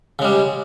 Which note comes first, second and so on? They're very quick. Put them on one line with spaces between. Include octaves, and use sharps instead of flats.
C#3 G#3 G3